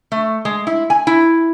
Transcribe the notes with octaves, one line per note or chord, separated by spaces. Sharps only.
A3
G#3
E4
G#5
E4